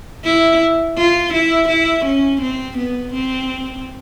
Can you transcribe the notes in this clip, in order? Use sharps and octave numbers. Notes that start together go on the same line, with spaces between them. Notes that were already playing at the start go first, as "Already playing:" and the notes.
E4
F4
E4
E4
C#4
C4
B3
C4